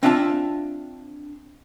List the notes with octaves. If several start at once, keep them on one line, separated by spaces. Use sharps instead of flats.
C4 D4 F4 E5 A5